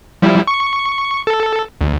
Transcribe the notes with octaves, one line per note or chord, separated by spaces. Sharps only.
F3 G3 E4
C#6
A4
D2